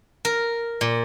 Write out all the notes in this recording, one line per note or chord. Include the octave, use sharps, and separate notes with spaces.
A#4
A#2